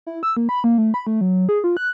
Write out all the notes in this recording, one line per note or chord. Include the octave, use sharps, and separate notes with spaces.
E4
E6
A#3
B5
A#3
A3
B5
A3
F#3
G#4
F4
F#6